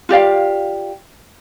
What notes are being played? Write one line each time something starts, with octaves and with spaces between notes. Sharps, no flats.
F4 G4 D5 F5